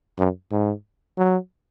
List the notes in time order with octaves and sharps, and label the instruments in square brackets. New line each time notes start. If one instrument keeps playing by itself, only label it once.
[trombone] F#2
G#2
F#3